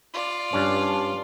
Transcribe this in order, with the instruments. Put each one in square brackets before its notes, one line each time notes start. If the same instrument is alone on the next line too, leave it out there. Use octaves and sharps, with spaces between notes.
[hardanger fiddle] F4 D5
[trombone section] G2 [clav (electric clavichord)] C#4 D4 A5